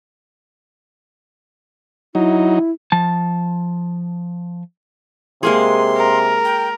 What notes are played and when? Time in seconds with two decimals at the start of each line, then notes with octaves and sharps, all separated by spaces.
2.15 F#3 D#4 E4
2.92 F3 A5
5.43 C3 G#3 A#3 G#4 C6
5.97 A#4
6.45 G5